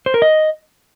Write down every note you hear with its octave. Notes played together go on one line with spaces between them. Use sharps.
C5
A#4
D#5